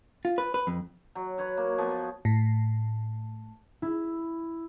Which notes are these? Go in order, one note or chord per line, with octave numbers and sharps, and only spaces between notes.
F4
B4
B4
F2
F#3
B4 C#5 F#5
A#3
F3 B3
A2
E4